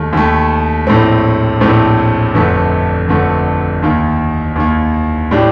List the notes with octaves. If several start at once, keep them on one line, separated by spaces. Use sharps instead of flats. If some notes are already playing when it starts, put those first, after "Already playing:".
Already playing: D#2 D#3 A3
D#2 D#3 A3
A#1 A2 A3 C4
A#1 A2 A3 C4
G1 F2 D3 A3
G1 F2 D3 A3
D#2 D#3 A#3
D#2 D#3 A#3
A2 G3 D4 G4